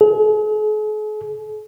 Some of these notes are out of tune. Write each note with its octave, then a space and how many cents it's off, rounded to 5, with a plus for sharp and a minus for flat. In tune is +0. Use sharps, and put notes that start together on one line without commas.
G#4 +45